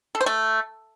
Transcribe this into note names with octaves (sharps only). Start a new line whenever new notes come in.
A4
C5
A3